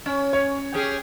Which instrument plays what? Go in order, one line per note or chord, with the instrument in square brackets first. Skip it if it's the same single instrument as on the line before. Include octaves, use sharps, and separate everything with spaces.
[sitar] C#4
[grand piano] C#5
[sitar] C#4 G4 G#4